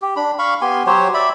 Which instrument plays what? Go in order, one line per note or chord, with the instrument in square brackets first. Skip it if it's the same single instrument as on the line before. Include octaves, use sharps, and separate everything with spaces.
[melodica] G4
D4 B5
F5 B5 C#6
B3 G4 G#5 C6
F#3 G4 C5 C#5
D5 E5 B5